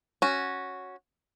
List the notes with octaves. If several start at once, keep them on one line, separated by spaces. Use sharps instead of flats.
C#4 F#4